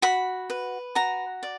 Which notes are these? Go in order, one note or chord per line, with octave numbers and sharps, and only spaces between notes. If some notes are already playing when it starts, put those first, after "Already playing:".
F#4 B5
B4
F#4 A#5
D5